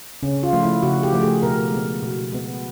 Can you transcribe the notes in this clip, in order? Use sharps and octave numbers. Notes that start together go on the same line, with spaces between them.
C#3 C#4
F4
F3 A3
E4
C#3 F#4
G4
F3 A3
G#4
B2 A#4
G#3 B3
B2
G#3 B3